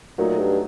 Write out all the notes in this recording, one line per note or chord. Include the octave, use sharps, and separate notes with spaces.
A#2 F#3 A3 D#4 F#4
G2